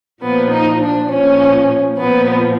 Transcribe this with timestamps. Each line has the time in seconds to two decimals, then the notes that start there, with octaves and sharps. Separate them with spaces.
0.22 A#2 F3 B3
0.51 D#4
0.81 D4
1.10 A#2 F3 C#4
1.99 A#2 F3 B3